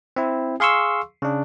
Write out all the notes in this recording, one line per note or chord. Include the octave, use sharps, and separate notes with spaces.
C4 E4
G#4 F5 C6 C#6 E6
C#3 D4